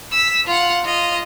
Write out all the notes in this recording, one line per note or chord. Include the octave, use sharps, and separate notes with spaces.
E6 B6
F4 F#5
F4 D#5